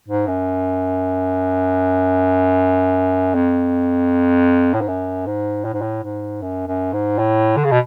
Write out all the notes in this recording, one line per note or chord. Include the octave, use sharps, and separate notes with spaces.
G#2
F#2
F2
A2
G#2
F#2
G#2
A2
G#2
A2
G#2
F#2
F#2
G#2
A2
D3
C#3
B2